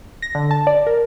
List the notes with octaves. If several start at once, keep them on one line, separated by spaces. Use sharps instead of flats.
A#6
D3
A5
D5
A#4